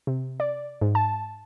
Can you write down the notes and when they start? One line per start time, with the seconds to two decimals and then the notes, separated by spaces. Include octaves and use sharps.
0.07 C3
0.40 D5
0.81 G#2
0.95 A5